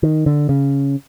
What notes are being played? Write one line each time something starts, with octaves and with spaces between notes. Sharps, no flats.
D#3
D3
C#3